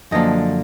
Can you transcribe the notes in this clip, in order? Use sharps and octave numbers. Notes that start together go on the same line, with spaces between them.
F#2 D3 F3 A#3 D4 D#5